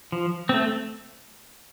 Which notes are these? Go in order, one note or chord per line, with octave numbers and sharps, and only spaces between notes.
F3
A3 C4